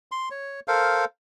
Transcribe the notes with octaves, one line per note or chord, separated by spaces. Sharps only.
C6
C#5
A4 A#4 C5 F5